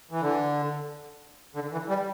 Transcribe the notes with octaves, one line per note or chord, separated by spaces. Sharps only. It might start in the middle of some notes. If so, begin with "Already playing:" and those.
E3
D3
D3
E3
G3